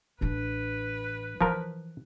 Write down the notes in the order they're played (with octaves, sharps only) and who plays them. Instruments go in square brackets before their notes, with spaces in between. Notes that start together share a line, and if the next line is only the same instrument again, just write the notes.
[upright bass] A1 D4 [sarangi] B4
[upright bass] E3 [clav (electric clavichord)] F3 A#4